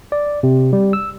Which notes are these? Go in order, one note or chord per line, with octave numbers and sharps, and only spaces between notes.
D5
C3
G3
E6